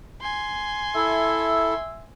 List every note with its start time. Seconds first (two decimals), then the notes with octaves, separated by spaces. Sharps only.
0.21 G#5 C6
0.95 E4 A4 E5